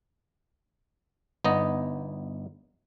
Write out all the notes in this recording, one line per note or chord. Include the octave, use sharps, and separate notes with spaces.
G1 B3 D#4 D#5